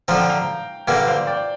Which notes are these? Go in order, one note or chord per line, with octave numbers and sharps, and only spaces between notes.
D3 F3 C4 A#5
G5
F5 A#5
G2 D3 A#3 D5 G5
C5 F5
D5 G5